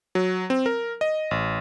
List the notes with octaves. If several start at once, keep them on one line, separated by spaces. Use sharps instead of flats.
F#3
C4
A#4
D#5
A1